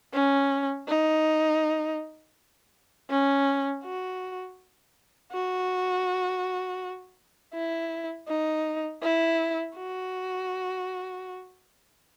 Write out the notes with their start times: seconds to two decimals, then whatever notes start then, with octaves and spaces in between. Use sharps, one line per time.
0.14 C#4
0.88 D#4
3.10 C#4
3.84 F#4
5.32 F#4
7.54 E4
8.28 D#4
9.02 E4
9.76 F#4